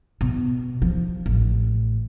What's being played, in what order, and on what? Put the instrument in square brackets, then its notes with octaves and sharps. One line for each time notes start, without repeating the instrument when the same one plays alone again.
[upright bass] B2
F3
A1